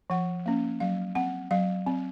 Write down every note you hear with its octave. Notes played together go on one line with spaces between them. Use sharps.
F3 F#5
A#3 C#4
F#3 F5
C4 F#5
F#3 F5
C4